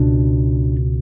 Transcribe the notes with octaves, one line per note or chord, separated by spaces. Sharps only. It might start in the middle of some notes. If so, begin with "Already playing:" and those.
Already playing: C#2 B2 D4